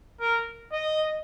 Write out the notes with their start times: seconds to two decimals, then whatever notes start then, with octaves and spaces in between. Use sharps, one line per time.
0.21 A#4
0.72 D#5